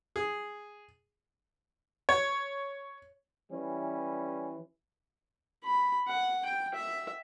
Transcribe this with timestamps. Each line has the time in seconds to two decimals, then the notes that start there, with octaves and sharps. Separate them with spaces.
0.16 G#4
2.09 C#5
3.50 E3 G3 C#4
5.64 B5
6.08 F#5
6.45 G5
6.74 E5